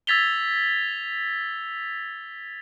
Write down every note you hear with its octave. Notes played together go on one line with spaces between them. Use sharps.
E6 G#6 A6 B6 F7 G7